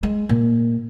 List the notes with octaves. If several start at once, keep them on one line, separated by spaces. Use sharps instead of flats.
G#3
A#2